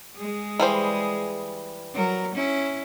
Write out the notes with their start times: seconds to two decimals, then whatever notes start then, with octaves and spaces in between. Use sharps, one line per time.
0.16 G#3 G#4
0.60 E3 G3 C5
1.94 F#3 A#4
2.35 C#4 E4